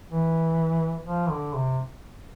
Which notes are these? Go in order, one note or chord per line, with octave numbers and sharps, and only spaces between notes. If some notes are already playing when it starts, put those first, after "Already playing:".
E3
F3
D3
C3